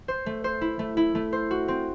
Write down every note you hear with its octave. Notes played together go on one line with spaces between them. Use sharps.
C5
A3
C5
E4
A3
E4
A3
C5
F#4
C4